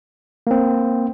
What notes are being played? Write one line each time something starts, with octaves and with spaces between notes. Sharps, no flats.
A#3 C4